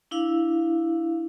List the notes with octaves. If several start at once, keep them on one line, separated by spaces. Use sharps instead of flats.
D4 E4 F5